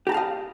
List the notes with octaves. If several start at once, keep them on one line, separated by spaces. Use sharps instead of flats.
G4 D#5 F5 A5 A#5